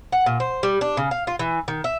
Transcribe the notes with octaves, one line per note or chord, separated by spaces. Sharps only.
F#5
A#2
C5
G3
D4
C#3
F5
F4
E3
D#3
E5